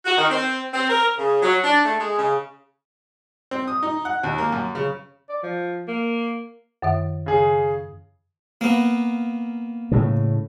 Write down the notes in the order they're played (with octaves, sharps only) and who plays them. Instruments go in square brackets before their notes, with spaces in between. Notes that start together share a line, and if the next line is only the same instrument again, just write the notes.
[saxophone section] F#4
D#3
C4
C4
A#4
C#3
F#3
D4
A3
G#3
C#3
[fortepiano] C4
D#6
D#4
F#5
D#2
A#3
F#2
C#3
[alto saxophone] D5
F3
A#3
[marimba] F#2 D#3 E5
[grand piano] C#3 G#4
[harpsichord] A#3 B3
[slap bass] A2 C#3